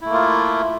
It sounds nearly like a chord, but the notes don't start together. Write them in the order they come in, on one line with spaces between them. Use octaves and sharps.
E4 A3 A#3 F4